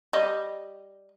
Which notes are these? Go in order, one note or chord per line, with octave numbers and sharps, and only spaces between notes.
G3 D#5